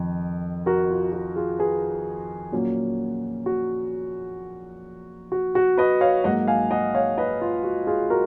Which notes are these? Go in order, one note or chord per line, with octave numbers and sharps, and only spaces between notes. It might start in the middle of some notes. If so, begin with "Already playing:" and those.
Already playing: F2 D#3
F#4 A#4
F4
F#4
F4 G#4
G#4 B4
A#2 F#3 A#3 C#4
F#4
F#4
F#4
B4 D#5
C#5 F5
G#2 F#3 A#3 D#5 F#5
F5 G#5
D#5 F#5
C#5 F5
B4 D#5
F4
F#4
F4 G#4
F#4 A#4